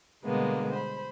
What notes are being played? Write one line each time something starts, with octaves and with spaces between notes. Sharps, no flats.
B2 D3 G3 G#3 A#3 B3
C5 B5